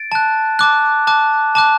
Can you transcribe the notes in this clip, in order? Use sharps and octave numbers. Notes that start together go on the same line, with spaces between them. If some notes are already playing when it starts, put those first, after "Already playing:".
Already playing: A6 D7
A5 F#6
A5 D6 F#6
A5 D6 F#6
A5 D6 F#6